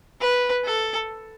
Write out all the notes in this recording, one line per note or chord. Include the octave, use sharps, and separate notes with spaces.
B4
A4